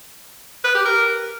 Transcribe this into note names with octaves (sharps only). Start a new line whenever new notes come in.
B4
G4
A#4